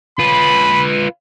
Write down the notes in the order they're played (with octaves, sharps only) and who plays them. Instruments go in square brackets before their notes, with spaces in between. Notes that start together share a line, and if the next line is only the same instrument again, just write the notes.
[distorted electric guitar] F4 B4 [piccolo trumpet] B5